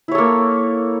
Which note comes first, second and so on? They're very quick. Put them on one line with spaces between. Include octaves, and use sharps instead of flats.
E4 C#5 A4 A#3